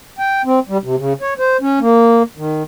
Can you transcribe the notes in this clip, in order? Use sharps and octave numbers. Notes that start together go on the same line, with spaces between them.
G5
C4
G3
C3
C#3
C#5
C5
C#4
A#3
D#3